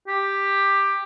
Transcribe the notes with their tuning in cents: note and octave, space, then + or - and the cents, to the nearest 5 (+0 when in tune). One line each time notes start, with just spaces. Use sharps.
G4 +10